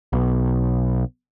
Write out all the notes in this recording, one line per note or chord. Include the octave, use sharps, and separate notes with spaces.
B1